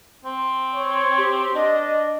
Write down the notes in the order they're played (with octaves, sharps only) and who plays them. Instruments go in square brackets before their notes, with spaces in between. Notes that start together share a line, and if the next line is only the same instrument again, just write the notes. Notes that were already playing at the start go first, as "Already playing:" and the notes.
[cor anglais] C4
[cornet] C#5
[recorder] G4
[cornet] D4 [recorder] D#5